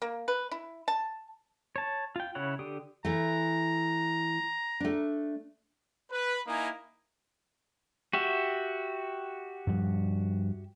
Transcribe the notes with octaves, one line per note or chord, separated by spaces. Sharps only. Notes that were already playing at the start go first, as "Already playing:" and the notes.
A#3
B4
E4
A5
C#5 A5
F4 G5
C#3 E4 C#5 F#5
D3 G4 D#6
E3 A3 A#5
A3 D4
B4
A#3 D#4 E4 G#5 A#5 D#6
F#4 G4 E5
G2 F3